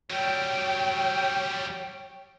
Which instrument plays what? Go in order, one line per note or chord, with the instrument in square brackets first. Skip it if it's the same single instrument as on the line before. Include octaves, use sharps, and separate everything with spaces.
[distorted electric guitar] F#3 G3 [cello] C#5 G5